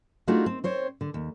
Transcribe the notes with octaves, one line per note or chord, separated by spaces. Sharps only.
A3 D4 D#4 F4 F#4 G#4
C4
C4 C5 C#5
D3
D#2